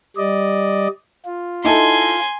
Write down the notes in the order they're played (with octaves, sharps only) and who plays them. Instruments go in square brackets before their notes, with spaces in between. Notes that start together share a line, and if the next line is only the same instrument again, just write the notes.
[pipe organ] G3 D5 D#5
F4
[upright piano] D#4 E4 A4 [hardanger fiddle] G#5 C6